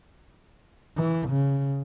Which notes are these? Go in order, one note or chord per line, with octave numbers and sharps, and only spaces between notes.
E3
C#3